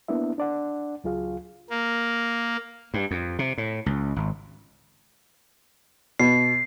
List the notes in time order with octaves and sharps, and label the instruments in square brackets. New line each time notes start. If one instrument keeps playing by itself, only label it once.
[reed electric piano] A#3 B3 D4 E4 E5
D4 D5 F#5
C#2 F#3 F4 G#4 F5
[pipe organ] A#3
[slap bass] G2
F2
C3
A2
C#2
G#1
[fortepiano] B2 [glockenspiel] C7